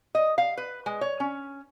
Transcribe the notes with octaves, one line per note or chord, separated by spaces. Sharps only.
D#5
F5
B4
G#3
C#5
C#4